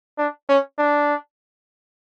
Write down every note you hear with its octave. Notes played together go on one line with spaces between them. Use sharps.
D4
C#4
D4